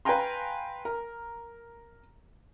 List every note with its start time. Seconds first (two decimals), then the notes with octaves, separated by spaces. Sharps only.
0.05 B4 F5 G5 G#5 A#5 C6
0.85 A#4